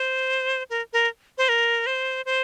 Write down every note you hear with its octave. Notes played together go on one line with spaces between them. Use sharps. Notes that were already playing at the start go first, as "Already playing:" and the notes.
Already playing: C5
A#4
A#4
C5
A#4
C5
C5